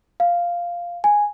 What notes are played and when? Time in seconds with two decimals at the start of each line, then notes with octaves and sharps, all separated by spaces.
0.20 F5
1.04 G#5